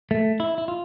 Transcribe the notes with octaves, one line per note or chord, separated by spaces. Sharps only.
A3
E4
E4
F4